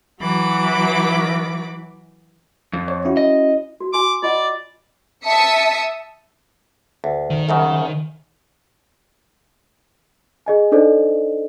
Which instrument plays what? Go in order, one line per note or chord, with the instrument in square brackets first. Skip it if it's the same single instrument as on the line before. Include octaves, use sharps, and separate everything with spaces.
[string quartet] E3 F#3 B5 D6
[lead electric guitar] F2
[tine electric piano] C#5
C#4 E4 F#4
[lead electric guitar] D#5
[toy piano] F#4
[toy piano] F#4 G#5 C6 [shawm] D6
[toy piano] F4 D#5 F#5 [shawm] D5
[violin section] E5 A5 D#6 E6 B6 C#7
[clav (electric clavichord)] D2
[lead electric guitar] D#3
[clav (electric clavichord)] C2 F#2 C#3
[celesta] G#4 D#5 G#5
D4 D#4 A4 C5 D5 D#5